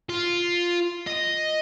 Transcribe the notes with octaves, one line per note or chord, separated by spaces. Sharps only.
F4
D#5